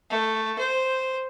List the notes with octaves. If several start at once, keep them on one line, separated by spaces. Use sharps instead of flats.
A3
C5